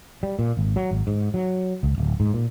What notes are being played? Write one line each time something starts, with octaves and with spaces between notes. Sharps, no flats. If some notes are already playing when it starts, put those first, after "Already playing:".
G3
A#2
G#1
F#3
G#1
G#2
F#3
C#2
D1
G#2
A#2